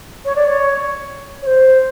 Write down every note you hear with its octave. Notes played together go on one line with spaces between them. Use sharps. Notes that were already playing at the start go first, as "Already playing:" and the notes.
C#5
D5
C#5
C#5
C5